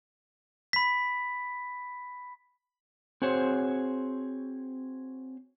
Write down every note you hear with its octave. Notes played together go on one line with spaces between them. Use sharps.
B5 B6
C4 F#4 G#4 C5 C#5